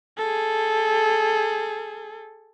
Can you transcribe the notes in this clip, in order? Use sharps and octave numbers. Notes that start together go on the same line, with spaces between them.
G#4 A4